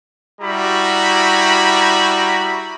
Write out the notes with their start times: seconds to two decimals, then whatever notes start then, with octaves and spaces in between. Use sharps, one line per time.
0.41 G3 E4 F#4 A#5 B5